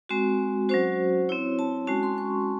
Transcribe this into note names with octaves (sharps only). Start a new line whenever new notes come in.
G#3 C4 F#4
F#3 C#4 F#4 C5
C4 E4 C#5
A5
G#3 C#4 F#4 A5
C6
C#6